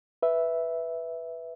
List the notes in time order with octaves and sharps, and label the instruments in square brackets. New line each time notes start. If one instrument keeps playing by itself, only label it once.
[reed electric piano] B4 E5